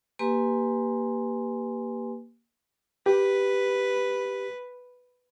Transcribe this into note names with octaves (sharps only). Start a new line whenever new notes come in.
A#3 G4 B4 G#5 C6
G4 B4